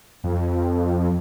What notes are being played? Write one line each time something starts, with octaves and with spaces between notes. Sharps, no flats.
F2